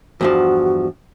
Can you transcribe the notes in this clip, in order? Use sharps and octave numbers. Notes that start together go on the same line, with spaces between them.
E2 G2 F3 F#4